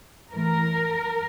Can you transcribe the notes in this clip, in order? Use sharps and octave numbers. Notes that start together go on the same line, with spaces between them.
A2 E3 A3 A#4